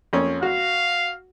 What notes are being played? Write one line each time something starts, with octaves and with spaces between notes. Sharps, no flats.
F2 A#3 C#4
F#4 F5